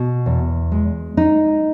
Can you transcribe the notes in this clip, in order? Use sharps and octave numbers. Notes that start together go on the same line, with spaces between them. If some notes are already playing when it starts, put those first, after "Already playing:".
Already playing: B2
E2
G#3
D#4